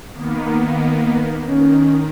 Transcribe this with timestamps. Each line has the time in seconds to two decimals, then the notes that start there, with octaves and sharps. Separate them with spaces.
0.13 D#3 A#3 B3
1.46 D#3 C#4